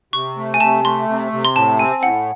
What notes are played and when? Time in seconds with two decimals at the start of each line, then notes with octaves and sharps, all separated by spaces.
0.13 C3 C#6
0.37 A3
0.54 G#5
0.60 C3 A5
0.84 A3 C6
1.09 C3
1.32 C3
1.45 C6
1.56 A2 A5
1.79 C4 G#5
2.02 A2 F#5